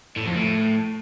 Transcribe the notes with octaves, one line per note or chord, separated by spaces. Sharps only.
A2
F2
A2